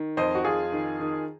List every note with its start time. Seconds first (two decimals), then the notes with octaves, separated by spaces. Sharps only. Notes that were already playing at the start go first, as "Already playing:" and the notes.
Already playing: D#3
0.17 F2 C5 D#5
0.35 F#4
0.44 F2 F4 G#4
0.72 D#3
1.00 D#3